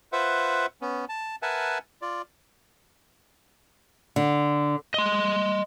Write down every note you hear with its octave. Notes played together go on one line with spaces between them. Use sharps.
F4 B4 C5 E5 F#5
B3 C#4
A5
A#4 B4 E5 F#5 G#5 A5
F4 D5
D3
D#5 C6